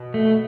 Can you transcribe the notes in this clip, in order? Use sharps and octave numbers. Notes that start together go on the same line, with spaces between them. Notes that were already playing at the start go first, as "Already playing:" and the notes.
Already playing: B2
A3